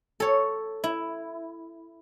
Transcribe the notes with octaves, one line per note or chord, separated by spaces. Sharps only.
A4 C#5
E4